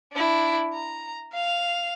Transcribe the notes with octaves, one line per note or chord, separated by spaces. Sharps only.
D4 E4
A#5
F5 F7